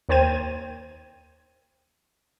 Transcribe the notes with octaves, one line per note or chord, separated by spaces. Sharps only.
D#2 A#3 C5 G5 G#6 D#7